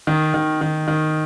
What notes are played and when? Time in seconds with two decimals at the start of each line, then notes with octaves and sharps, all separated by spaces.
0.07 D#3
0.34 D#3
0.61 D#3
0.88 D#3